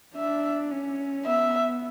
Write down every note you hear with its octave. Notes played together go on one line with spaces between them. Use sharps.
D4 E5
C#4
B3 E5